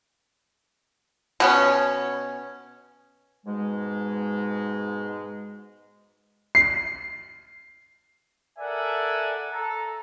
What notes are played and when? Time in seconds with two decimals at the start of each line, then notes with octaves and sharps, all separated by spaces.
1.40 B2 B3 C#4
3.46 G#2 B2 G#3
6.55 C7
8.59 A4 A#4 D5 E5 F#5 G#5
9.52 A4 A#5